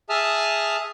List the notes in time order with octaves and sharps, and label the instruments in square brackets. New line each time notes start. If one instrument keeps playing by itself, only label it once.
[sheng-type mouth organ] G#4 E5 A5 D#6 F6